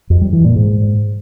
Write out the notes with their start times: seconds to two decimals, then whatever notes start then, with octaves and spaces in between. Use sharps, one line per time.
0.10 F2
0.21 G3
0.33 E3
0.44 A#2
0.56 G#2